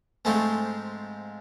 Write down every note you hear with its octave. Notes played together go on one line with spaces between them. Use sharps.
G#2 F3 G#3 A3 C4 F4